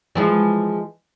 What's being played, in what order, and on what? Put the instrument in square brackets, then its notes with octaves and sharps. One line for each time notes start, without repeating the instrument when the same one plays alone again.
[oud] E3 F3 G#3